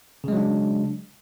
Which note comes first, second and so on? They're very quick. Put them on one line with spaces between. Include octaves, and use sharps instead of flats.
C#3 G#3 F#3 D4